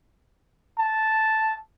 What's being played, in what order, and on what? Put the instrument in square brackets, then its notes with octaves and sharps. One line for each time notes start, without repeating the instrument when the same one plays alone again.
[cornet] A5